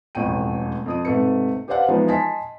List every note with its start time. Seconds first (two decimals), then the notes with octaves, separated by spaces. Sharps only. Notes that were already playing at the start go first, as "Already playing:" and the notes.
0.15 E1 A1 F2 A2 G5 D#7
0.86 F2 D#6 D#7
1.05 G#2 C3 A3 B4 C#7
1.68 G4 B4 C5 D5 F5 F#5
1.88 E3 F3 G#3 B3 D#4
2.08 D#5 G#5 A5 C6 B6